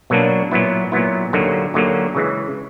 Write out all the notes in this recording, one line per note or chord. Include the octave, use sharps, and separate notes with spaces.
B2 F#3 A#3 D4
A#2 F#3 B3 E4
A#2 F#3 B3 E4
D#2 D3 F#3 A#3
D#2 D3 F#3 A#3
C#3 E3 G#3